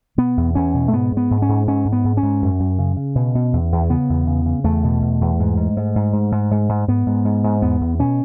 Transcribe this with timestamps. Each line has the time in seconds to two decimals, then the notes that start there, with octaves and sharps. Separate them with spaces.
0.18 B2 B3
0.37 E2
0.55 E2 C#4
0.74 B2
0.88 A3
0.93 G#2 B3
1.12 G#2
1.17 B3
1.31 G#2
1.42 C#4
1.49 G#2
1.67 G#2 C#4
1.85 G#2
1.93 B3
2.04 G#2
2.17 C#4
2.23 G#2
2.42 F#2
2.60 F#2
2.79 C#3
2.97 C#3
3.15 B2
3.35 B2
3.53 E2
3.72 E2
3.90 C#3 B3
4.09 E2
4.27 C#3
4.46 C#3
4.64 E2 A3
4.84 B2
5.02 E2
5.21 E2
5.40 G#2
5.57 G#2
5.77 G#2
5.95 G#2
6.13 G#2
6.32 G#2
6.51 G#2
6.69 G#2
6.88 G#2 B3
7.06 G#2
7.25 G#2
7.44 G#2
7.62 E2 B3
7.81 E2
7.99 B2 C#4